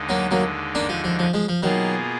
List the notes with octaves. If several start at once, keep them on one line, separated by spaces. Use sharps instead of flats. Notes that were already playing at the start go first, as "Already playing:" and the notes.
Already playing: D#2 D3 G#3 D#4
F#3 A#3
F#3 A#3
A#3 D4
F3
F3
F3
F3 G#3
F3
B2 D#3 F#3 A#3 F4 G#4